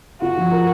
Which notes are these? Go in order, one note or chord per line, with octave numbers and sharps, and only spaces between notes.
F4 F#4
F3
A#4